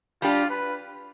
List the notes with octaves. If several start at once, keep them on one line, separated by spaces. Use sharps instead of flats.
G3 D4 F4 G4
B4